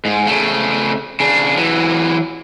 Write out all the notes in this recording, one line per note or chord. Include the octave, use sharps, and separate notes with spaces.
G#2
C#3 A3
C#3 D4
E3 F#3